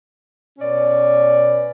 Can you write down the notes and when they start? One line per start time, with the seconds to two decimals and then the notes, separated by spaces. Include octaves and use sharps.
0.59 B2 C#4 D5